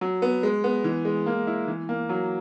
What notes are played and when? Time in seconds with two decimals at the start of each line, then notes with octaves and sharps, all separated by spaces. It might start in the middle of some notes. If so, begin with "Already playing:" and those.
0.01 F#3
0.22 B3
0.43 G#3
0.64 B3
0.84 E3
1.05 G#3
1.26 A#3
1.47 E4
1.68 E3
1.89 A#3
2.09 F#3